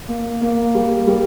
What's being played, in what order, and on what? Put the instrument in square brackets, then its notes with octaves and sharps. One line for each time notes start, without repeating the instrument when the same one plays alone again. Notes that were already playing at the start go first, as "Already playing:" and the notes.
[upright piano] A#3
A#3
G3
G3